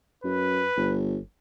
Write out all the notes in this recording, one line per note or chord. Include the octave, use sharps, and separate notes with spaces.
F#2 B4
G1